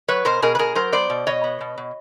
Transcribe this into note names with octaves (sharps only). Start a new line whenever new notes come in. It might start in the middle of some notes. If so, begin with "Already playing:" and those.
F#3 B4 C#5
B2 A#4 C5
B2 G#4 A#4
B4
B2 G#4 A#4
F#3 A#4 C5
B3 C5 D5
B2
B2 C#5 D#5
B3
B2
B2